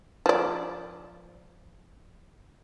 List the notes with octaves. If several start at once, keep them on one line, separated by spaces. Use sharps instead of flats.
F3 D5